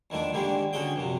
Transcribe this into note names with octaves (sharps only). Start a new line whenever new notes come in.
E2 D#3 F3 A3 D4
G#2 D3 D#3 G3 G#3 A#3
D3 C#4 F#4 G#4 G5
A#1 F#2 C3